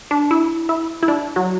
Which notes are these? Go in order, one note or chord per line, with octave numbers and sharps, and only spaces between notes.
D4
E4
E4
E4
D4
F#3